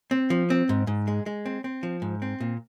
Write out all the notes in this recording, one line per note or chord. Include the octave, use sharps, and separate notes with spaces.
C4
F3
C4
G#2
G#2
G#3
G#3
C4
C4
F3
G#2
C4
A#2